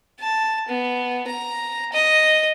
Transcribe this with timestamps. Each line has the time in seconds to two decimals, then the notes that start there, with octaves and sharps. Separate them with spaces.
0.20 A5
0.68 B3
1.27 A#5
1.92 D#5